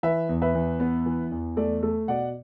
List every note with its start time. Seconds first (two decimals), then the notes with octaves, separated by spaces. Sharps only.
0.03 E3 B4 E5
0.29 E2
0.42 B4 E5
0.55 E2
0.80 B3
1.06 E3
1.32 E2
1.57 A3 A4 D5
1.83 A3 A4
2.08 B2 D5 F#5